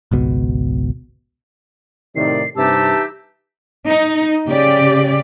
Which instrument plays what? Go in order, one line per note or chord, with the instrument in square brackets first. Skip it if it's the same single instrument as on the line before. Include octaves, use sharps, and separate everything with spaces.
[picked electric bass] G#1 C#2 B2
[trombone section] A2 C3 D#3 [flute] D5 [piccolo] C7
[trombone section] G2 C3 [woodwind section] E3 D#4 G4 [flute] A5 [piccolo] E6
[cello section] D#4
C#3 G4 D5